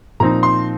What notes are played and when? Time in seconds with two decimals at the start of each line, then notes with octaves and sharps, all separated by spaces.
0.20 A#2 F3 C4 D#4 A#5
0.43 C6